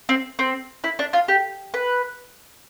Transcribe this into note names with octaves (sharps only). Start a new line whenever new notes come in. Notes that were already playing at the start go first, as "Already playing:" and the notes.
C4
C4
E4
D4
F4
G4
B4